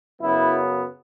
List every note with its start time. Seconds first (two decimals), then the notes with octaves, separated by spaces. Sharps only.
0.21 F#2 C#3 F#3 B3 E4